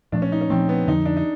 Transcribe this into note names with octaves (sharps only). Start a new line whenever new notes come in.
A#2 F3 A3 D4
C#4
D#4
C#4
A#2 F3 A3 C4
B3
F2 D3 F3 D#4
D4
D#4